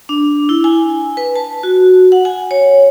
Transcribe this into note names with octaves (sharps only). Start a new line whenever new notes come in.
D4
E4
G#5
B4
A5
F#4
F#5
G#5
C#5